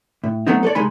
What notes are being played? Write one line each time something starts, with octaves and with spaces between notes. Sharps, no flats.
A2
F#3 A3 B3 C4 D#4
A4 B4 C#5 D5
C2 G#3 D#4 G#5 B5